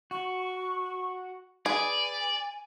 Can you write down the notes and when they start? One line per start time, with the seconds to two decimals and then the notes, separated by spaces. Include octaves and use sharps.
0.11 F#4 C#6
1.66 G#4 B4 D5 G#5